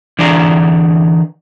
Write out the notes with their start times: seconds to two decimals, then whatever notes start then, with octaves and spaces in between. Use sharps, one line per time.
0.19 D3 E3 D4 G#4 D5 A#5